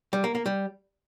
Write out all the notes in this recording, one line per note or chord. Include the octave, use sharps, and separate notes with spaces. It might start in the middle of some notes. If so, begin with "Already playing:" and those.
G3
A#3
A#3
G3